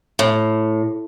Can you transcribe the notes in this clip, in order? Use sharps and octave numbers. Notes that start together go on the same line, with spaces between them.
A2